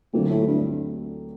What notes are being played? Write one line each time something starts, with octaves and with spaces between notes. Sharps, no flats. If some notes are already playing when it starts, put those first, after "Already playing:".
D2 A#2 D3 F#3 A3 C4
A2
G2